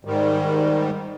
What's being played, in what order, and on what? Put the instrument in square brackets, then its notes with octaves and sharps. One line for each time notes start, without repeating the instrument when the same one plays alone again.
[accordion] G#2 D#3 G3